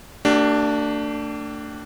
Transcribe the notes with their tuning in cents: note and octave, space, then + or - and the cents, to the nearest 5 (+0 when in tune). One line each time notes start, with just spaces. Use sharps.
A3 +40 D4 +0 G4 -30